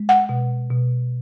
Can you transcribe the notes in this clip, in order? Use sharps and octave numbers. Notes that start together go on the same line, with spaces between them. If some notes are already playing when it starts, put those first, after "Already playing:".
Already playing: G#3
F#5
B2
B2